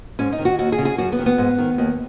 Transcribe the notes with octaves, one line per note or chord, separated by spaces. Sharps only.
G#2 C#4
D#4
D#3
F#4
D#2 F#4
G#4
C#3
G#4
F#2 F#4
B3
D#3
B3
G#2
D#3
D#2